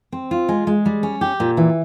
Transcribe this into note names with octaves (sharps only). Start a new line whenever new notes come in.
C4
F4
G#3
G#3
G3
C#4
G4
A#2
E3